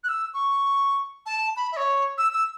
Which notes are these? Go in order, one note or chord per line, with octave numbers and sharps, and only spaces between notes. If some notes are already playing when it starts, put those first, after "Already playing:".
F#6
E6
C#6
A5
B5
E5
C#5
E6
E6